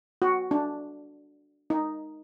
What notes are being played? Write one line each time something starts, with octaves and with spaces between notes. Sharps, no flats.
F#4
D4
D#4